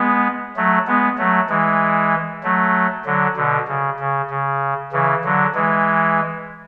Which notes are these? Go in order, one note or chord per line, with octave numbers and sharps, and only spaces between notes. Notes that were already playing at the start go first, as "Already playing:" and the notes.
Already playing: G#3 B3
F#3 A3
G#3 B3
F#3 A3
E3 G#3
F#3 A3
D3 F#3
B2 D3
C#3
C#3
C#3
C#3 E3
D3 F#3
E3 G#3